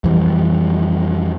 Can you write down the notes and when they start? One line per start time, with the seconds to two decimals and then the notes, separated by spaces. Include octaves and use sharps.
0.04 F2 E3 G3